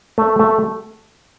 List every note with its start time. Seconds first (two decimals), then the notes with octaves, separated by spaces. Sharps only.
0.18 A3
0.39 A3